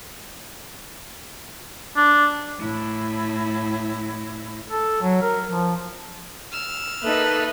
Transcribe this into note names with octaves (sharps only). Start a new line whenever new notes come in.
D4
A2 E4
A4
F#3
A#4
F3
E6 F6
A#3 D#4 A4 B4 D#5 E5